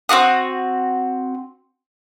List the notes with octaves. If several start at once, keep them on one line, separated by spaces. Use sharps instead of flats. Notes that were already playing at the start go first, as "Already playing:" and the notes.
C4 F4 F#4 D#6